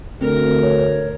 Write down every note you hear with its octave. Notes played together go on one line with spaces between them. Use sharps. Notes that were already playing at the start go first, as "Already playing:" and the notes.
D2 C4 A#4
C#5